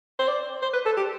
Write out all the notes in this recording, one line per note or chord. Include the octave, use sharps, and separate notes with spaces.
C5
D5
C5
B4
A4
G4